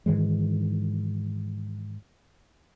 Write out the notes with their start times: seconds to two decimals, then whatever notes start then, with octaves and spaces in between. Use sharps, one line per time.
0.06 G#2 D#3 E3 G#3